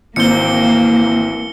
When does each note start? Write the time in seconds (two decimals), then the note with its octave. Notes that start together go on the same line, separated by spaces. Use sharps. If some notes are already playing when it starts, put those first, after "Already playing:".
0.16 G#1 E3 A#3 C4 G6 C#7 G7